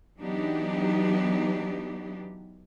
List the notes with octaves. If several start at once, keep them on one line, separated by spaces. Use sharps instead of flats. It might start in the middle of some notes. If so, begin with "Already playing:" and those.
E3 F#3 B3 D4 D#4 G4